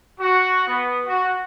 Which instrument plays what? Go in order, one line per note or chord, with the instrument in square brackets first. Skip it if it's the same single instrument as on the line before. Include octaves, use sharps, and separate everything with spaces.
[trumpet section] F#4
B3
F#4